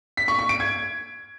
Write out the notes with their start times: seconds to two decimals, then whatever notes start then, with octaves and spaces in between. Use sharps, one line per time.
0.17 B6
0.28 C#6
0.39 C#6
0.49 D7
0.60 G#6